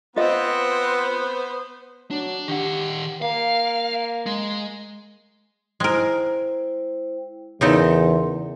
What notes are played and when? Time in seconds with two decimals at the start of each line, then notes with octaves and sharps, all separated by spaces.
0.16 B3 C4 F4 B4 C5 D#5 F#5
2.11 F#3 D4
2.48 D#3 G4 F#5
3.22 A#3 F5
4.26 G#3
5.80 G#3 E4 A#4 C5 G5
7.61 E2 C#3 D#4 A4 A#4 C6